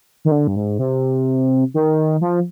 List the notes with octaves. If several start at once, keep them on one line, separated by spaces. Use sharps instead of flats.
D#3
D3
G2
G#2
C3
D#3
F3